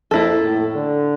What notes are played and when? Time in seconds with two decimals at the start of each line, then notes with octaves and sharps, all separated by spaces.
0.11 F2 A#3 E4 A4
0.43 A2
0.75 D3